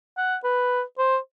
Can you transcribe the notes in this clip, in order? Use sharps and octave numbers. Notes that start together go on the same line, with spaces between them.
F#5
B4
C5